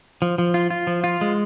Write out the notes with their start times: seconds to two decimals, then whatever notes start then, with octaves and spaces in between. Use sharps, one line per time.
0.22 F3
0.38 F3
0.54 F4
0.70 F4
0.87 F3
1.04 F4
1.21 G#3